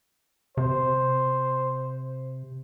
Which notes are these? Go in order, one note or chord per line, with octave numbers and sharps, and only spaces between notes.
C3 C5